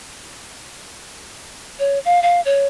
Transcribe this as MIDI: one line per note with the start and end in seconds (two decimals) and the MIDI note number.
1.79 1.99 73
2.05 2.20 77
2.23 2.41 77
2.45 2.67 73